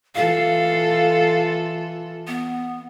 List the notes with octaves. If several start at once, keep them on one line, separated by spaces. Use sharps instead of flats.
E3 F4 A4 F5
B3